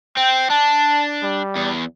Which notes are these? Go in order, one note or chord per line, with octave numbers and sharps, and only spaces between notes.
C4 G5
D4 A5
G3
E2